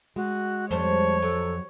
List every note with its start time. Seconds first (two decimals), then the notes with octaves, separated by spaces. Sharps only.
0.16 G#3 F#4
0.71 F2 G3 G#3 C5 C#5 A5
1.22 F#3 A4